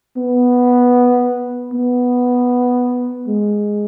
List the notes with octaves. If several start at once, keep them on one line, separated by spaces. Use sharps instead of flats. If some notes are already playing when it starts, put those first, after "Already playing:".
B3
B3
G#3